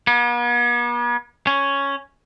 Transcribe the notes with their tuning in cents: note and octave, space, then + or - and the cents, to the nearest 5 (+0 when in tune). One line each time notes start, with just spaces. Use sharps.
B3 -45
C#4 +0